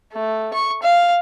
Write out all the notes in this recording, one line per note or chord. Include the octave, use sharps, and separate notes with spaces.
A3
C#6
F5